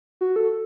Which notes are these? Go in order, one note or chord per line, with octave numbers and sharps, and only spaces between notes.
F#4
A4